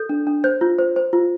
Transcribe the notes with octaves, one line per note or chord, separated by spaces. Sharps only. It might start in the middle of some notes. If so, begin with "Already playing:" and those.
Already playing: A4 G6
D4
D4
C5 G6
F4
C5
C5
F4